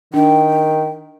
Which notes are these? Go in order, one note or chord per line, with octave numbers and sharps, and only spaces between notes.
D#3 D4 G5